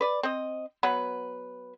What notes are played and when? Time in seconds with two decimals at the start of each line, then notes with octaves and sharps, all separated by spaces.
0.01 B4 D5
0.23 C4 D#5
0.83 F#3 B3 B4